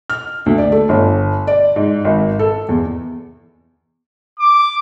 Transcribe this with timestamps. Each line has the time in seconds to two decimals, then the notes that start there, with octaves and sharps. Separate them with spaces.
0.10 F6
0.46 D2
0.58 D5
0.72 A3
0.89 G1
1.47 D5
1.76 G#2
2.05 G#1
2.39 A4
2.69 E2
4.39 D6